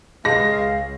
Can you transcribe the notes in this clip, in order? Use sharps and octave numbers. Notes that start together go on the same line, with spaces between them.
C#2 G#3 F5 A#6